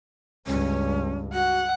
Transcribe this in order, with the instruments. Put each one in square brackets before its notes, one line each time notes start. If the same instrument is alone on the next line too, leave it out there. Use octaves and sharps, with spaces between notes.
[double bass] C#2 G2 [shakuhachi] C#4
[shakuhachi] F#4 [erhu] F#5